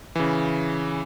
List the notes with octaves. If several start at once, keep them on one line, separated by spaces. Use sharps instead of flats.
C#3 E3